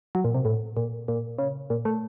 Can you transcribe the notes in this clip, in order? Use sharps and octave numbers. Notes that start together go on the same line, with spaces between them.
F#3
A#2
C3
A2
A#2
A#2
C#3
A#2
A3